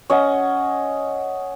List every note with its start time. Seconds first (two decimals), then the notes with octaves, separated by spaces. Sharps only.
0.10 C#4 D#5 F#5